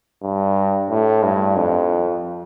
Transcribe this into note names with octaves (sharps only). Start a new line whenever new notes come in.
G2
A2
G2
F2